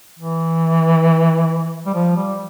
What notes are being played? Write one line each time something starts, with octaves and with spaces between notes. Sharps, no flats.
E3
G3
F3
G3